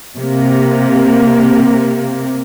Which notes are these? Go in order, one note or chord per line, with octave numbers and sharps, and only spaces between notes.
C3 A#3